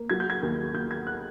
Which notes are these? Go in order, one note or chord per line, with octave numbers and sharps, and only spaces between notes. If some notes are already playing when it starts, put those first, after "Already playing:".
Already playing: A#3
F#3 G#6
G6
G#6
D#2
D#2 G6
G#6
F#6